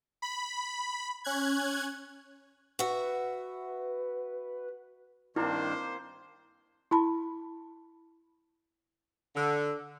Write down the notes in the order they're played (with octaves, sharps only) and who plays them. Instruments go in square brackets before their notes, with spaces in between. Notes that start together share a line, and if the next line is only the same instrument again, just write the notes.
[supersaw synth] B5
C#4 F#6 G#6
[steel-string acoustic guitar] F#4 E5 [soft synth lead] B4
[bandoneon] G2 D#3 D4 [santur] A#3 C4 [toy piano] E4 [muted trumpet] C5
[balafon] E4 A5 B5
[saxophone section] D3